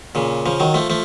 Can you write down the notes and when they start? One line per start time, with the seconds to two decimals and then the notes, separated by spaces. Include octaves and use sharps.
0.15 A#2 C#3
0.46 C#3 F3
0.60 D#3 F#3
0.74 F3 A3
0.90 F3 A3